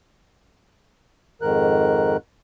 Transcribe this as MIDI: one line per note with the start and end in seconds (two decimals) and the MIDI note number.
1.42 2.17 41
1.42 2.17 44
1.42 2.17 51
1.42 2.17 70
1.42 2.17 90